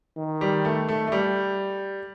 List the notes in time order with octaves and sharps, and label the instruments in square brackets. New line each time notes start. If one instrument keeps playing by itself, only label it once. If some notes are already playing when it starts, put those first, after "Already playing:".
[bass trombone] D#3
[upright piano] G3
A3
A3
A3
G3